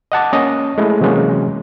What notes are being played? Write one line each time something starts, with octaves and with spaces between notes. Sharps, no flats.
D#5 F#5 A5 D6
A#3 C#4 D#5
G#3 A3 E4
C3 E3 F#3 G#3 A#3 C#4